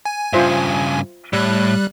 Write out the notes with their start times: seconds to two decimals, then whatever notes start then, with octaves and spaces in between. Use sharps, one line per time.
0.05 G#5
0.33 G2 C#3 F4 C5 E5
1.33 A2 G3 F#6